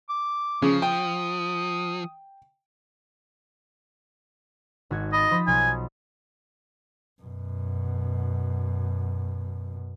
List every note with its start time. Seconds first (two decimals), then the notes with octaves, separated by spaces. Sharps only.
0.09 D6
0.62 C#3 F3
0.82 G5 D#6
4.91 G#1 F#4 G#6
5.13 D#5 B5 D#6 A6
5.31 F3 C5 B5
5.47 B1 G#5
7.23 F#2 B2